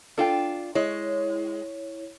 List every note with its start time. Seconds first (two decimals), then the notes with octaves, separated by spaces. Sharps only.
0.18 D4 F4 A4 G5
0.75 G#3 E4 C#5